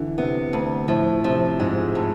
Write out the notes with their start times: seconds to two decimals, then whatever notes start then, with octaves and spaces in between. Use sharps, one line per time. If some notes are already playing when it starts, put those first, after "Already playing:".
Already playing: D3 E3
0.18 C3 B3
0.53 D2
0.88 A2 F3
1.24 C3 F3
1.60 G#2 G#3
1.95 A2